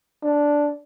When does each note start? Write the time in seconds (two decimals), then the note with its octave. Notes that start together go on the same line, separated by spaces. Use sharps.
0.23 D4